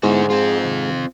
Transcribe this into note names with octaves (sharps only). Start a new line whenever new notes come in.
G#2 D3 G#3 B3 E4 F#4
G#3 C4 F4 G#4
C3 D#3